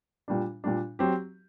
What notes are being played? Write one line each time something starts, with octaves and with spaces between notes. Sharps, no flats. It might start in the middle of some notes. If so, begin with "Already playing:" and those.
A#2 G3 D4
A#2 G3 D4
F#3 C4 G4